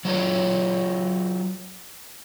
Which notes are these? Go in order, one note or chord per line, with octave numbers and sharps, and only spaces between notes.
F#3 F4 G#4 C#5